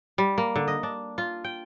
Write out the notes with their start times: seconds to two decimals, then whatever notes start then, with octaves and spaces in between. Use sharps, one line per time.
0.18 G3
0.38 A#3
0.56 D3
0.68 D#5
0.83 D4
1.18 F4
1.44 G5